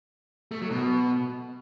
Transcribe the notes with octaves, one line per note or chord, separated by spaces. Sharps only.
A3
F#3
B2